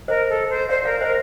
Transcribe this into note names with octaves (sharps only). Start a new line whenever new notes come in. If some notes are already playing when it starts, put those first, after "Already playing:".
A#4 C5 D#5
A4
C5
C5 D5 F5
A#4 D5 F5
A#4 C5 D#5